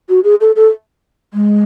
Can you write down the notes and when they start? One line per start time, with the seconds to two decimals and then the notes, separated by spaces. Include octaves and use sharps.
0.09 F#4
0.24 G#4
0.41 A4
0.56 A4
1.34 G#3